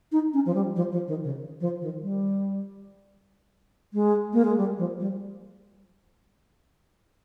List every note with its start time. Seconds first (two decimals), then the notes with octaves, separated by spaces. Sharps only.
0.12 D#4
0.33 C#4
0.46 F3
0.55 G3
0.76 F3
0.92 F3
1.08 D#3
1.24 C#3
1.60 F3
1.81 D#3
2.02 G3
3.94 G#3
4.33 A#3
4.45 G#3
4.57 G3
4.78 F3
5.00 G3